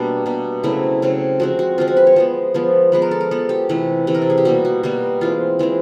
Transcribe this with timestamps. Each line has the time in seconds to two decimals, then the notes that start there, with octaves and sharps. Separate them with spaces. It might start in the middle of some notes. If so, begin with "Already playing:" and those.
Already playing: B2 G3 A#3 D4
0.26 B2 G3 A#3
0.64 C#3 F#3 A3 C4 E4
1.02 C#3 F#3 A3 C4
1.40 F3 G#3 C4 F#4
1.59 F#4
1.78 F3 G#3 C4 F4
1.88 F#4
1.97 B4
2.07 C#5
2.16 F3 G#3 B3 C5
2.54 F3 G#3 B3
2.92 F3 G#3 B3 B4
3.02 A#4
3.11 A4
3.21 A#4
3.31 F3 G#3 B3 A4
3.49 G4
3.69 C3 E3 A3
4.07 C3 E3 A3
4.15 A#4
4.22 A4
4.30 G#4
4.38 G4
4.45 B2 G3 A#3 F#4
4.65 F#4
4.83 B2 G3 A#3 F#4
5.21 E3 G#3 C4 F4
5.59 E3 G#3 C4